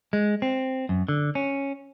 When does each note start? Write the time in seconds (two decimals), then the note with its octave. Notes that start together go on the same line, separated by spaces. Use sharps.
0.13 G#3
0.42 C4
0.89 F#2
1.09 D3
1.35 C#4